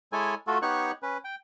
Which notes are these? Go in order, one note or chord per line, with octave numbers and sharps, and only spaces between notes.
G#3 E4 A4 C#5 G#5
A3 F4 F#4 A4
B3 D#4 G4 C#5 C#6 F#6
C#4 B4
G5